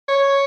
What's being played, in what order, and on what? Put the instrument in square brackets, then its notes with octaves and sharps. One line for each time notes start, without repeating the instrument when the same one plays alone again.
[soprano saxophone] C#5